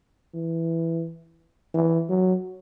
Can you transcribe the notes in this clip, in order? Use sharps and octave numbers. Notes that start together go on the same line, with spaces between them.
E3
E3
F#3